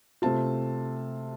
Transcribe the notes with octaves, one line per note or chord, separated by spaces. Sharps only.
C3 A3 C4 F4 A5